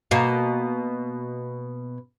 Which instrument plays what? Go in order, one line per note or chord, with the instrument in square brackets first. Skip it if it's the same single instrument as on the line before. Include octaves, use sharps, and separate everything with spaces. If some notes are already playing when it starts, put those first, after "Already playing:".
[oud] B2 A#3